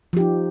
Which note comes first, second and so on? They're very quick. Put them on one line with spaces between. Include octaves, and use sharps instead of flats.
F3 G4 D#4